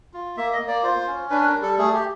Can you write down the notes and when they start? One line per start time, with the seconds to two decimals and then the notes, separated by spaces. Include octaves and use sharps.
0.13 F4
0.37 A#3 E5
0.53 D#5
0.60 A#3
0.68 D5
0.83 F4 C5
1.07 C#4
1.30 D4 B4
1.41 B4
1.47 A#4
1.54 G3
1.63 A4
1.78 A3 G#4
1.94 G4